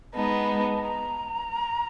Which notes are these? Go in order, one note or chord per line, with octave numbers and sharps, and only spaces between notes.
G#3 B3 D#4 A5
A#5